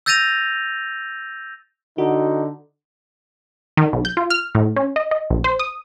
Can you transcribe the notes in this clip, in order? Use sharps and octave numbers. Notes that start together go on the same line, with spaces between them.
E6 G6 A6 A#6 D#7 F7
D3 D#4 F#4
D#3
B1
G6
F4
F6
A2
C#4
D#5
D#5
A#1
C5
D#6